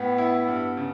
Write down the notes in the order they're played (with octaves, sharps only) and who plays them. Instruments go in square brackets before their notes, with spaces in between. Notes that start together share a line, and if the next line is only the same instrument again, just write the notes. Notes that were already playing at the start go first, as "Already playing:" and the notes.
Already playing: [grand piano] A2 [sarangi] B3
[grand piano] E4
G2
C#3